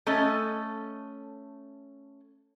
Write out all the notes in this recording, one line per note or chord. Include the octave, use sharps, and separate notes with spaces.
A3 C#4 A4 D#5